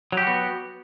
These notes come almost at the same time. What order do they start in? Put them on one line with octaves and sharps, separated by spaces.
F#3 G4 F#4 B3